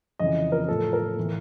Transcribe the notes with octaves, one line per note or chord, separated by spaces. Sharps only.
F2 C#3 E3 D#5
A#4
A2 F3 A4
A#4
A2 E3